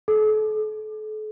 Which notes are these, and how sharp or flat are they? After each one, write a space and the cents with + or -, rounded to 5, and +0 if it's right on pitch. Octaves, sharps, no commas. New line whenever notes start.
A4 -40